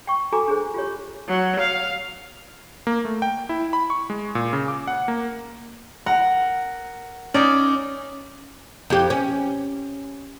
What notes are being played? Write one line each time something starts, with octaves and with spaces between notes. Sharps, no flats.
G5 C#6
F#4 A4 G#5 A#5 D6 D#6
D4 G#4 C5
F4 G4 C#5
F#3
F5
A#3
A3
G5
E4
B5
C#6
G#3
A#2
C#3
D6
F#5
A#3
A#4 F#5
C#4 D#4 D5
F2 G4
C#4